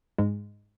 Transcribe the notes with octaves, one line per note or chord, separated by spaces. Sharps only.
G#2 G#3